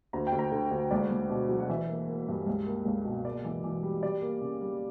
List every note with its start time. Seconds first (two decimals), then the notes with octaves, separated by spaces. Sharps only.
0.13 D2 A#5
0.27 G5
0.32 D2
0.39 A#5
0.52 D3
0.71 D2
0.91 C#2 D5
1.11 C#2
1.30 B2
1.49 F#3
1.60 F#5
1.69 E3 E5
1.89 A#3
2.08 A#3
2.28 G2
2.46 C#2
2.66 A#3
2.85 C#2
3.05 B2
3.24 A#3 D5
3.45 E3
3.64 E3
3.83 G3
4.03 G3 D5
4.22 A#3
4.41 C#3
4.61 G3